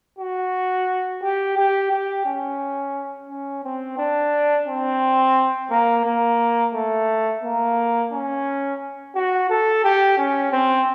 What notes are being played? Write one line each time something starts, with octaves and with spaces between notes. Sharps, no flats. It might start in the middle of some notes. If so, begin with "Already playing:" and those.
F#4
G4
G4
G4
C#4
C#4
C4
D4
C4
A#3
A#3
A3
A#3
C#4
F#4
A4
G4
C#4
C4